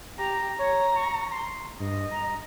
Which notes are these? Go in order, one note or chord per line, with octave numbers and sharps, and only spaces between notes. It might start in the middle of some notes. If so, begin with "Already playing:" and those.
G4 A#5
C#5 A#5
C#6
C6
G2 D#5
A#5